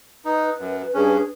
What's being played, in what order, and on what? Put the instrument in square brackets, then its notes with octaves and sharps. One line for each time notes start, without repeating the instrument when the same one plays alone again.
[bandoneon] D#4 [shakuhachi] B4
[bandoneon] F#2
[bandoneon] G2 C#4 [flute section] D4 G#4